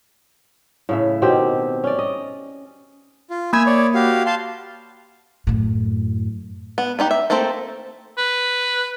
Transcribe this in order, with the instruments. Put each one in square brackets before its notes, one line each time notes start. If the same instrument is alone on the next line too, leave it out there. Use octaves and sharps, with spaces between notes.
[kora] A2 C#3 E5
B2 D#3 C4 G4
C#4 D5
D#5
[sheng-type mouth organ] F4
[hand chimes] A#3 B5 G#6 [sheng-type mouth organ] G#5 E6
[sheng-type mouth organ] C#5 D5
F#4 G4 F5
F5 A5 C6
[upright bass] F#2 A2
[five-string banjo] B3
B3 D#4 G4
E5
A3 A#3 C4 A4 C5
[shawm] B4